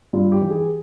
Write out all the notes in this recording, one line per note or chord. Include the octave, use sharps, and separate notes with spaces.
G2 F4
G4
E3
G#4